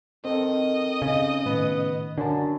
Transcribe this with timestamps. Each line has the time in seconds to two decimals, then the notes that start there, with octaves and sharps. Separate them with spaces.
0.25 D#3 C4 A4 D#5
1.02 C#3 D#4
1.46 A2 D#3 B3
2.18 F#2 D3 D4 A5